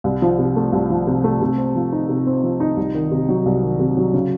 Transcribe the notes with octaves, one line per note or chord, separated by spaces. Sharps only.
C2
F3
C3
A3
C2
F3
C3
A3
C3
C4
F3
D#4
C3
C4
F3
D#4
C2
D#3
C3
F#3
C2
D#3
C3
F#3
C#3